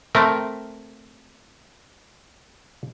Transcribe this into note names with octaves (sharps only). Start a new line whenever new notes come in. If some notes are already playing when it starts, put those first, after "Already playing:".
A3 C4 A#4